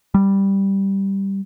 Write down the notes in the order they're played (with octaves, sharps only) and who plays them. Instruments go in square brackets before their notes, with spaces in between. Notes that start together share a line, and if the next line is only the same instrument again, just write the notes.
[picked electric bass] G3